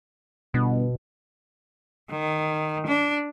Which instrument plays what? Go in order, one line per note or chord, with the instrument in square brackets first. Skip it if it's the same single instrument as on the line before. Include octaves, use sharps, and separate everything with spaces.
[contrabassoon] G1 [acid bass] B2
[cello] D#3
D4